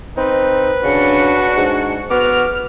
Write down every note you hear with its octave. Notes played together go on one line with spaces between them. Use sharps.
C4 D#4 B4
C#3 D4 F#4 C#7
G#2
B3 F#4 D6 F6